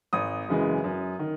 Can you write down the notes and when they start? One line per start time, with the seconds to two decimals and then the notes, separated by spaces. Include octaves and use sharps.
0.13 G#1 D#6
0.48 F#2 C#3 E3 G#3
0.84 F#2
1.19 D#3